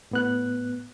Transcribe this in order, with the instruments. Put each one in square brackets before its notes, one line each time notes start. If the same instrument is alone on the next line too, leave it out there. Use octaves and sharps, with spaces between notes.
[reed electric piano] A2 B3 F#6